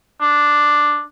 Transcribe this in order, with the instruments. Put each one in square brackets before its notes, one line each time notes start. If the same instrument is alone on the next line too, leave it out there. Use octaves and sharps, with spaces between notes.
[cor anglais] D4